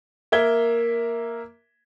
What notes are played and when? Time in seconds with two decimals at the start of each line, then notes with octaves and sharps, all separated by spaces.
0.32 A#3 A#4 E5 G#6 G7